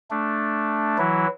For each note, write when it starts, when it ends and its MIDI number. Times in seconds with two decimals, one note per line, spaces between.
0.11 0.98 57
0.11 0.98 62
0.98 1.27 52
0.98 1.27 54
0.98 1.27 64